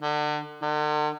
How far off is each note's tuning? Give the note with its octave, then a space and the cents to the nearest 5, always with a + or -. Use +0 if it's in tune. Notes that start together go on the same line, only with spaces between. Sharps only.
D3 +30
D3 +45